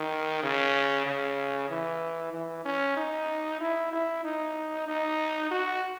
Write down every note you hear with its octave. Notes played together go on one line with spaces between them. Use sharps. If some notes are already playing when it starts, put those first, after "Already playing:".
Already playing: D#3
C#3
C#3
E3
E3
C#4
D#4
E4
E4
D#4
D#4
F#4